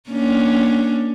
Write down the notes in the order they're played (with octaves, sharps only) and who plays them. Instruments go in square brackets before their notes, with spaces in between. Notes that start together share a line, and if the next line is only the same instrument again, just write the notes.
[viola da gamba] A#3 C#4 D4